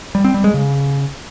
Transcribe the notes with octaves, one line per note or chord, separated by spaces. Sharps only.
G3
C4
G3
G#3
C#3